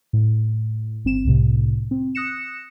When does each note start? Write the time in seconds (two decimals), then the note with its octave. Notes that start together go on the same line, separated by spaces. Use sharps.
0.13 A2
1.05 G1 C4 E7
1.25 C2 A2 C3
1.91 C4
2.15 D#6 F#6 A#6 C#7 E7